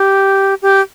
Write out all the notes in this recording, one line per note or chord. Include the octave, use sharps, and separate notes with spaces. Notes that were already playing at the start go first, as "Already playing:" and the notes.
Already playing: G4
G4